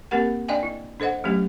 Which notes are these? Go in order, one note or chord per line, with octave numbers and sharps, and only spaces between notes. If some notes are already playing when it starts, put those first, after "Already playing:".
A#3 C4 G4 A#4 F#5
D4 D5 D#5 F5 G5 G#5
E4
D4 A4 C5 D#5 F#5
F#3 A3 C#4 G4